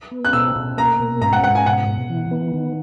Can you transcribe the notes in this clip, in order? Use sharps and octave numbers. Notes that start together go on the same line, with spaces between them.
B3
F#6
B2 E6
B2
A#3 A#5
B2
G#2 A#5
F#5
G#2 F#5
G#5
B2 F#5
B2
E3
B3
D#3